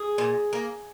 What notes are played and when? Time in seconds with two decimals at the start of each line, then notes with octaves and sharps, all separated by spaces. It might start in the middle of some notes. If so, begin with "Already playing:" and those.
Already playing: G#4
0.18 A#2
0.53 A#3